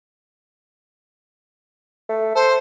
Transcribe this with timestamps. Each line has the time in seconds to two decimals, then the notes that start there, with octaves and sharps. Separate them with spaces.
2.09 A3
2.35 A4 C5